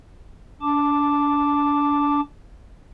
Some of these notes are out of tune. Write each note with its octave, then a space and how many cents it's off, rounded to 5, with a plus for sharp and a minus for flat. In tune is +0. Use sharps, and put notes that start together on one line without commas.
D4 -30 A5 -5 D6 +0